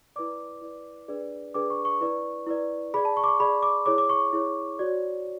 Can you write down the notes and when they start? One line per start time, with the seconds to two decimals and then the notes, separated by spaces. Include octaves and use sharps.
0.16 E4 B4 D5 D6
0.62 E4 B4 D5
1.08 D4 G#4 B4 D5
1.54 D4 G#4 B4 D5 D6
1.70 C#6
1.85 C#6
2.01 E4 B4 D5 C#6
2.47 E4 B4 D5
2.94 G#4 D5 B5
3.05 A5
3.17 C#6
3.24 D6
3.28 C#6
3.40 G#4 D5 B5
3.63 D6
3.86 E4 G#4 C#5 D6
3.98 D6
4.09 C#6
4.33 E4 G#4 C#5
4.79 F#4 C#5 D5